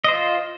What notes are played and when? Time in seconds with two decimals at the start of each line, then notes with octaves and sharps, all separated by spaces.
0.04 D#5
0.08 C5
0.12 F4